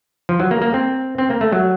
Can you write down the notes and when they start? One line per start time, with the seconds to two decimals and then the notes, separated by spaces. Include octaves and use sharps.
0.29 F3
0.40 F#3
0.51 A#3
0.62 A#3
0.74 C4
1.18 C4
1.30 A#3
1.41 A3
1.52 F#3